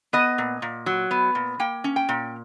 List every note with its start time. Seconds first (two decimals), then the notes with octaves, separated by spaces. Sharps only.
0.13 B3 D#5
0.38 A#2
0.62 A#2
0.86 F#3
1.11 B3
1.35 A#2
1.60 A#3 G5
1.84 C#4
1.96 G5
2.09 A#2